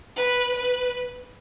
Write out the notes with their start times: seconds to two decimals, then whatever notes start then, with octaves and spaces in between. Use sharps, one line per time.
0.17 B4
0.54 B4